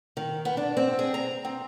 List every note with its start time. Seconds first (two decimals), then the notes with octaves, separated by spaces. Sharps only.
0.17 D#3
0.45 B3
0.57 D4
0.77 C4
0.99 G#4
1.14 A#5
1.45 C4